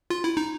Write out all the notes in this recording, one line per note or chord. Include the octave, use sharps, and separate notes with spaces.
F4
E4
D#4